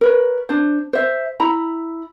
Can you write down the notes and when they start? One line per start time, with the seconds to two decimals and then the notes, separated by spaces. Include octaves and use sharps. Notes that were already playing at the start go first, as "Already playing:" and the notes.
0.01 A#4 B4 C#5
0.49 D4 C5
0.93 C5 E5
1.40 E4 A#5 B5